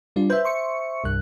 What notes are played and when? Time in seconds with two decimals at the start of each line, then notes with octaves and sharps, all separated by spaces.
0.16 G3 D4 F4
0.30 B4 C5 E5 G6
0.44 C6 C#6 C#7
1.04 C2 G2 F#6